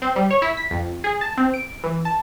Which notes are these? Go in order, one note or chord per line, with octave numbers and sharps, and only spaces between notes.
C4
G3
C#5
E4
B6
F2
G#4
A5
C4
D7
E3
A5